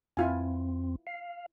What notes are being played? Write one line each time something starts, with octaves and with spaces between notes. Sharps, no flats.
F2 C4 E4 F4 G#5
F5